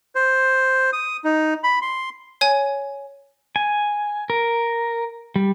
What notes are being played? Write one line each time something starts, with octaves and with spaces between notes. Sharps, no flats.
C5
D#6
D#4
B5
C6
C#5 G#5
G#5
A#4
G3